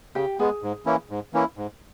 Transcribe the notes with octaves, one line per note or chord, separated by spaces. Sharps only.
C#3 G4 G5
G#3 B3 G#4 G#5
G#2
E3 A#3 C#4 E4
G#2
E3 A#3 C#4 E4
G#2